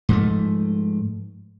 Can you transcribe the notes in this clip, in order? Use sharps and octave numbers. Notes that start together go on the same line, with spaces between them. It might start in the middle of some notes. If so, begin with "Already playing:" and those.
G#2 F3 A3